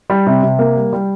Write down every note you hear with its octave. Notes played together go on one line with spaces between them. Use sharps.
G3
C3
C3
A#3
G3
G3